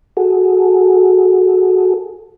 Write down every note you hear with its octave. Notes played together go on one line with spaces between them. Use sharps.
F#4 G#4 A4